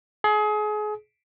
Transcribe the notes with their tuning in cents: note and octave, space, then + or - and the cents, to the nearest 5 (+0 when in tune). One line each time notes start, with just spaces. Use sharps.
G#4 +30